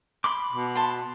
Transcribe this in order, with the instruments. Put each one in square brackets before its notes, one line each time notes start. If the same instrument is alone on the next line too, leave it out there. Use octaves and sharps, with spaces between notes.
[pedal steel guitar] B5 D6 [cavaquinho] C6
[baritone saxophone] B2
[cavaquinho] A5 C6